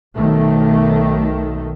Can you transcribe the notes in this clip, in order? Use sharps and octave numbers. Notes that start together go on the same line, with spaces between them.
B1 D#3 A3